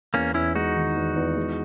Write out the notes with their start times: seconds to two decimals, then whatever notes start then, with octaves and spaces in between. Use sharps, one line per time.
0.14 E2 A#3 C#4
0.34 E2 C#4 E4
0.55 G#3 D#4 F#4
0.75 D#3
0.96 E2
1.16 E2
1.36 G#3